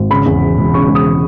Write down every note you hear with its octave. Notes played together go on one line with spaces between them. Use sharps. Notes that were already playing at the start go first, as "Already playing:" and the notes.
Already playing: G#1
C#3 B5
E2
E3
E1
C#3 C#6
E2
D#6
E3